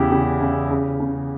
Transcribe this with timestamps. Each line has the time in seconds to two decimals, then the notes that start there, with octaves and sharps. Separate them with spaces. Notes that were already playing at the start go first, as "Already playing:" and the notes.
Already playing: E2 C#3 E4 G4
0.12 C#3 G4
0.41 C#3
0.71 C#3
1.00 C#3